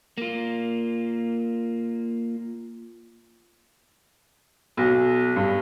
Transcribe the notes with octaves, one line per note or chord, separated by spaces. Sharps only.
A#3 F4
B1
G2